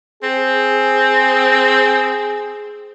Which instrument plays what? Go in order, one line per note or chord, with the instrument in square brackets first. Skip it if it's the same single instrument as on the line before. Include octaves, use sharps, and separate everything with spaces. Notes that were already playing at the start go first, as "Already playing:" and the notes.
[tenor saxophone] C4 [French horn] G#4